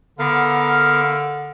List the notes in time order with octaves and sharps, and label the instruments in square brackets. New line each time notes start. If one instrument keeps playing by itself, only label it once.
[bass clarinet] D3 [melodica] B3 A#4 F5